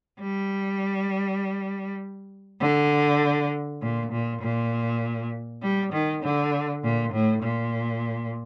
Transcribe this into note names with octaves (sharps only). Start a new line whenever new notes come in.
G3
D3
A#2
A#2
A#2
G3
D#3
D3
A#2
A2
A#2